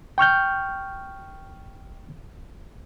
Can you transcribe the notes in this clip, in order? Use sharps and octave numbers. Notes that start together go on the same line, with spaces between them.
G5 C#6 F6 G6